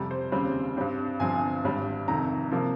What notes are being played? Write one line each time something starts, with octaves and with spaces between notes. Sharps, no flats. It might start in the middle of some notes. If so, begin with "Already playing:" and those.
Already playing: F2 C3 G3
C5
D#2 C#3 G3 C4
G2 G3 C4
G1 G2 F3 C4 G#5
G#1 G2 G3
F1 F2 D#3 A#5
C3 F3 A#3